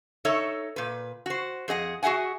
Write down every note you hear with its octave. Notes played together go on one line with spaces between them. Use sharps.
D#4 A4 C#5 E5
A#2 B4
F#4 C5
F2 G#4 D#5 F#5
F#4 G#4 E5 F#5 G#5